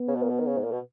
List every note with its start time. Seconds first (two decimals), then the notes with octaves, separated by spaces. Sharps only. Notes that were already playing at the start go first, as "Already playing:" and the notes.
Already playing: B3
0.08 C#3
0.16 B2
0.22 A#2
0.29 B2
0.40 D#3
0.47 C#3
0.58 G#2
0.64 A#2
0.72 B2